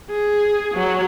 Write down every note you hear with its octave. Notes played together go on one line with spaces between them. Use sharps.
G#4
F#3